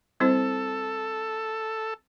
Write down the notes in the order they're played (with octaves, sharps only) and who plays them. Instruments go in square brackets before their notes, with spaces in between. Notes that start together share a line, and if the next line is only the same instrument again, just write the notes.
[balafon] G3 C4 E4 C5 [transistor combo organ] A4